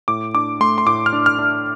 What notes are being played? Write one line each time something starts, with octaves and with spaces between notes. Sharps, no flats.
A2 D6
D4 D6
A3 C6
C6
A2 D6
F6
D4
F6
D4